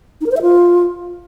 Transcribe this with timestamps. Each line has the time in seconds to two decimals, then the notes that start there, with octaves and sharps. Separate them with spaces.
0.21 D#4
0.26 A#4
0.31 C5
0.37 E5
0.42 F4